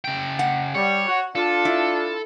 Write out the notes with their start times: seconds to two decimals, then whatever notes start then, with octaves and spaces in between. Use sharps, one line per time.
0.04 C#3 G5
0.39 F#5
0.75 G3 C#5
1.07 F#4
1.35 D4 F4 A4
1.65 E4